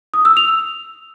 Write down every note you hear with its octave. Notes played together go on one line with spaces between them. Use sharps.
D#6
E6
F7